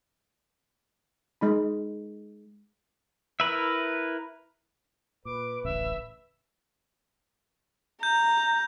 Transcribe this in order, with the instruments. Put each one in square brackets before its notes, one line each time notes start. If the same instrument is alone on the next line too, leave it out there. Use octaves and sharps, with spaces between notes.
[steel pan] G#3 D#4 B5
[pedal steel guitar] E4 A#4 B4 E5
[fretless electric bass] A#2 [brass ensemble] B4 [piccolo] D6
[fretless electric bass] D1 A1 C#3 [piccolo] E5
[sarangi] A#5 [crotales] G6